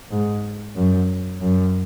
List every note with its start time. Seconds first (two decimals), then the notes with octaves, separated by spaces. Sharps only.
0.10 G#2
0.76 F#2
1.41 F#2